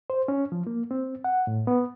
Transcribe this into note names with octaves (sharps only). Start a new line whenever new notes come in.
C5
C#4
F3
A#3
C4
F#5
A2
B3